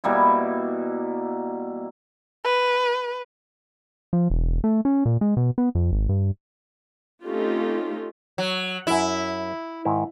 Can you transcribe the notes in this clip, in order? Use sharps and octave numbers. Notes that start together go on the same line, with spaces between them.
B2 G3 A#3 E4
B4
F3
E1
A3
C#4
A#2
G#3
B2
B3
F2
G#1
G2
A3 C4 C#4 D#4 F4 G4
F#3
F#2 F#3 E4
G#2 D#3 E4